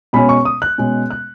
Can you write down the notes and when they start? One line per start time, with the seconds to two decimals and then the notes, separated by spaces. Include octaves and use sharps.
0.13 B2 G#3 C#4 B5
0.29 C#6
0.45 D#6
0.62 F#6
0.78 B2 G#3 C#4
1.11 F#6